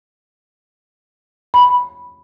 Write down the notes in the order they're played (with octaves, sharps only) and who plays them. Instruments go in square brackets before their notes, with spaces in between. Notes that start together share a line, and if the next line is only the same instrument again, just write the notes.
[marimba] B5